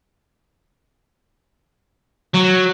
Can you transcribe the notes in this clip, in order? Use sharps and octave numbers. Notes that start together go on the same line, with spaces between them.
F#3